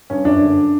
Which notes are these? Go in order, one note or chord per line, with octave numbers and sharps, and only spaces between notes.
G2 C#4
F#2 D4
D3